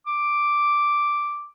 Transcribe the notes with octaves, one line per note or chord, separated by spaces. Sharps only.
D6